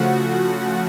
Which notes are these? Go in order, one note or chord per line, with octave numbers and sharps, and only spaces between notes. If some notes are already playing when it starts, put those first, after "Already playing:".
Already playing: C#3 F3 A3 F#4 F#5